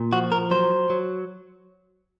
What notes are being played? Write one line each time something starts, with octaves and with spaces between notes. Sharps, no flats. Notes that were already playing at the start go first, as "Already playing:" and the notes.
Already playing: A#2
F3 F#4
A#4
F#3 C5
F#3